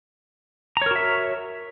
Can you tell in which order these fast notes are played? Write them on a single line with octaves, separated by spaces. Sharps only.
A#5 C#5 A#4 F#4 E5